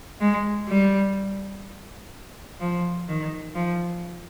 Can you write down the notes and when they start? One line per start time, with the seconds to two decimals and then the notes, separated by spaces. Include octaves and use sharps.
0.21 G#3
0.69 G3
2.60 F3
3.08 D#3
3.55 F3